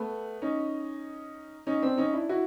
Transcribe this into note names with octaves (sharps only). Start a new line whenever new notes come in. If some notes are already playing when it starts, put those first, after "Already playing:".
Already playing: A3 B3
C#4 D#4
C#4 D#4
C4 D4
C#4 D#4
D4 E4
E4 F#4